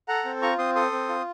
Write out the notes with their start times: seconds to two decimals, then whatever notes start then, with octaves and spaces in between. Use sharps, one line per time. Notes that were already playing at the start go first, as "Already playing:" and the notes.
0.08 A4 F#5 A#5
0.25 C4
0.42 F4 A#5 C#6
0.58 C4 C6 D#6
0.75 A4 C6 D#6
0.92 C4
1.09 F4